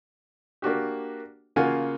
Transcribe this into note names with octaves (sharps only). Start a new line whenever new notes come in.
A#3 D4 F#4 G4
C#3 A#3 F4 F#4 F#5 G#5